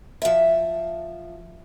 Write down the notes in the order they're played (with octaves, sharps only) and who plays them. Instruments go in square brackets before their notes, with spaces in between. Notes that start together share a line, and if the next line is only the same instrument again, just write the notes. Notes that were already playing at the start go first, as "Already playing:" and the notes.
[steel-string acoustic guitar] F3 E5